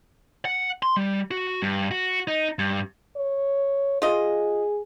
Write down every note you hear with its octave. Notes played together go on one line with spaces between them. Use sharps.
F#5
C6
G3
F#4
G2
F#4
D#4
G2
C#5
F4 G#4 D#5